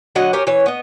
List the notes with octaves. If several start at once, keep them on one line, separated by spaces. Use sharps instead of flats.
D3 F#3 D#5 F#5
G4 A#4 C#5 G#5
E3 C#5
B3 D#5